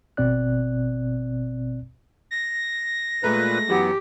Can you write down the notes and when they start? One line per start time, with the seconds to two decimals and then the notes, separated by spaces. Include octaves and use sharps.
0.17 G#1 B2 C4 D5 F#6
2.31 A#6
3.23 A#2 G#3 A3 B4 A#5
3.69 F#2 E3 F#3 B3 G4 F#5